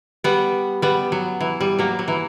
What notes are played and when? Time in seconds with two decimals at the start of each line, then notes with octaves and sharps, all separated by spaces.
0.24 G3 B3
0.82 G3 B3
1.12 F#3
1.40 E3
1.61 G3
1.79 F#3 A#3
1.99 F#3
2.08 E3